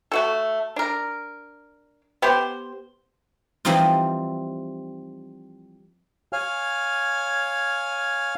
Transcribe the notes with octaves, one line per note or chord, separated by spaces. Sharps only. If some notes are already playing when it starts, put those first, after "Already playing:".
A3 F#4 A4
D4 A#4
B3 G4 C5
E3 F3 G3 C4 D#4 F4
C#5 F5 G#5 F6